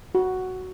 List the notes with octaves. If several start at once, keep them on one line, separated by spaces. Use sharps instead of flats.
F#4